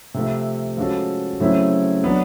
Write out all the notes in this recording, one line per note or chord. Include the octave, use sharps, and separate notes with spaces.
C3 F3 A3
F3 G#3 C#4 F#4 A4
C#3 F#3 A3 C4 E4
F#3 B3 D4